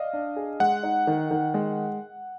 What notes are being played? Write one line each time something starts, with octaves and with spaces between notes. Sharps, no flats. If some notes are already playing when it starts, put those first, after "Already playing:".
Already playing: D5 D#5 F5
D4
G#4
G#3 F#5
D#4
D#3
D#3
G#3